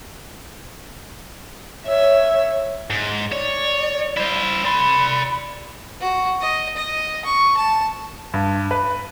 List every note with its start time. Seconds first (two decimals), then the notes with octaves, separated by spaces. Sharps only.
1.86 C#5 E5
2.90 G#2
3.32 C#5 D5
4.17 E4 C5
4.65 D5 B5 C6
6.00 F#4
6.41 D#5
6.76 D#5
7.25 C#6
7.57 A5
8.34 G2
8.71 B4